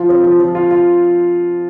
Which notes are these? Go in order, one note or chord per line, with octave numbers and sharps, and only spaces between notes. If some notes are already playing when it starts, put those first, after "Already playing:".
Already playing: F3 F4
C4
F3
F3
F4
F4